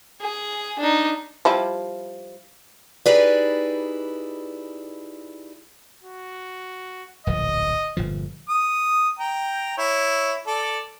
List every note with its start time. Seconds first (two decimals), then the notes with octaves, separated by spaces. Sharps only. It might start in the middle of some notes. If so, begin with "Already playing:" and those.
0.21 G#4
0.79 D4 D#4
1.45 F3 G3 E4
3.06 D#4 E4 G4 G#4 B4 D5
6.03 F#4
7.27 D1 A#1 F3 D#5
7.97 G1 A#2 F3
8.49 D#6
9.19 G5 A#5
9.78 E4 C#5
10.47 A4 D5